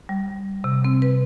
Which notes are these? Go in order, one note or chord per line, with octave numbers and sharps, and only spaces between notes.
G3
C3
C4
B4